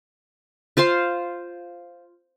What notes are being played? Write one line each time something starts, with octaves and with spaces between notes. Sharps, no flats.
F4 C5 F5 C6